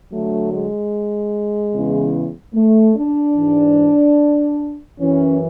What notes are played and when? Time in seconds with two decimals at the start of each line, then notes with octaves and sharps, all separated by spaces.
0.10 D2 D3 F#3 A3
0.51 G#3
1.74 E2 C#3 E3
2.55 A3
2.96 D4
3.36 G#2 E3
4.99 F#2 E3 C#4